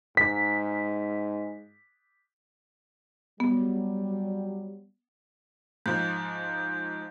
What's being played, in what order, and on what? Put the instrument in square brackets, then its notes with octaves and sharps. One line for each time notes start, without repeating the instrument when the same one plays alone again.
[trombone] G#2 [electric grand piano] B6
[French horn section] F#3 G3 [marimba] B3
[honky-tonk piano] G#2 F3 [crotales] G6